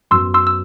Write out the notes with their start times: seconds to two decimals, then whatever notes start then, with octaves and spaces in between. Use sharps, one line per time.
0.11 F#2 F#3 B3 C6 E6
0.34 C6 E6
0.47 E6